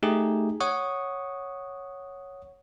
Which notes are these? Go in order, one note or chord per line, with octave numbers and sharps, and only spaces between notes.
A3 D#4 G4 G#4
C#5 F#5 C#6 D#6